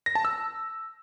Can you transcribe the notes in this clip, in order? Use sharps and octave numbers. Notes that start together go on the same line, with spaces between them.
A#6
A5
E6